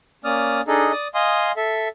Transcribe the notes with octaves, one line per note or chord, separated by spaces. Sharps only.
A#3 C#4 D5 D#6 F6
D4 D#4 G#4 A4 D#5
D5 D#6
D#5 F5 G#5 C6 D#6
A4 E5